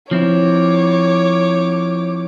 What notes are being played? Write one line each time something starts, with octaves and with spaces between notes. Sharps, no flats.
F3 C4 E4 C#5 D6